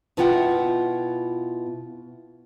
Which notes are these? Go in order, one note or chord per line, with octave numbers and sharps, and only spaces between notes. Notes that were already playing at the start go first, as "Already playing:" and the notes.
B2 E4 F4 E5 F#5 G5